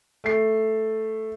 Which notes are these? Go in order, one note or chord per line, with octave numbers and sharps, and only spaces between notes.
A3 C7